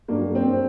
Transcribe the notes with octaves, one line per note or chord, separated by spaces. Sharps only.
G2 F#3 A#3
C4